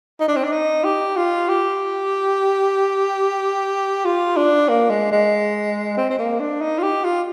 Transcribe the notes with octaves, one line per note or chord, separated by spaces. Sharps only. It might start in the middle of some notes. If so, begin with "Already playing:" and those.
D#4
D4
C4
D4
D#4
G4
F4
G4
F4
D4
A#3
G#3
G#3
C4
C4
A#3
D4
D#4
F4
G4
F4